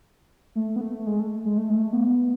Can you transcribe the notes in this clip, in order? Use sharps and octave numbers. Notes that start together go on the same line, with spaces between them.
A3
B3
A3
G#3
A3
G#3
A3
G#3
A3
B3